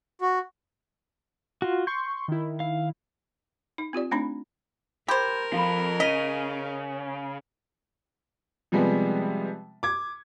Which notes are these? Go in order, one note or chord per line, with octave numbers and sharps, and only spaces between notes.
F#4
F4 F#4
C6 C#6 G6
D#3 E4
F5
D#4
C4 F4 G4 D5
A3 C4 D4 D#4 B5
G4 A#4 C5 B5 G6 G#6
F2 F3 F5 B5
C#3 D#5 B6 D#7
C3 F3 G3 G#3 B3
D6 G#6